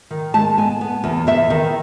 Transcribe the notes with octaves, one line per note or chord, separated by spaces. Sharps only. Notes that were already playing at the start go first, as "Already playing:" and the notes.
D#3
G#3 A5
B3 G#5
B3
E2
E2 E5
D#3